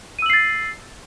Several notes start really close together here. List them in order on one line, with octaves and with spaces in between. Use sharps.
D#7 E6 F#7 C7 A6